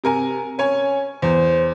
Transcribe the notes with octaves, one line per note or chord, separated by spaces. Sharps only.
C3 A#4 G#5
C#4 C#5 G#5
E2 C5